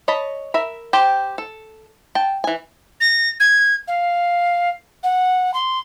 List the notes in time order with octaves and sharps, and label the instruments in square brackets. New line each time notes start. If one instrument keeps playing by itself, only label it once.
[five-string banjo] C#5 D#5 A5 B5
A#4 E5 B5
G4 C5 G5 A5
A4
G5 A5
E3 G#5
[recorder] A#6
G#6
F5
F#5
C6